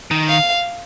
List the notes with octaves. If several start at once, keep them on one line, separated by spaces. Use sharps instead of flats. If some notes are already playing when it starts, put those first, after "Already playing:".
D#3
F5